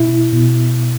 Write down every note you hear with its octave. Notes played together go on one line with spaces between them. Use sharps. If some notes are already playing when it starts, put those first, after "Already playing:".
Already playing: B2 E4
B2